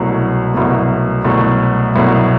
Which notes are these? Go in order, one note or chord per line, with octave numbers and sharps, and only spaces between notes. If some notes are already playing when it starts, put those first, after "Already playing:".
Already playing: C2 B2 F#3 A3
C2 B2 F#3 A3
C2 B2 F#3 A3
C2 B2 F#3 A3